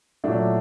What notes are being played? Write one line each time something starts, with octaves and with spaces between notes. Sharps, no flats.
A#2 F#3 A3 D4 E4